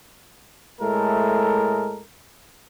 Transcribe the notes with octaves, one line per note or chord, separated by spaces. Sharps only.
A2 G#3 A3 A4 A#4